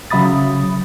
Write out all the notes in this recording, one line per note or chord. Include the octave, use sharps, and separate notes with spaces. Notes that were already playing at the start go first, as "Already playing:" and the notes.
C#3 F#3 E5 B5 D#6 A6